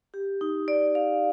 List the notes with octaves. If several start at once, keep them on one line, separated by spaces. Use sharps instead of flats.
G4
D#4
D5
F5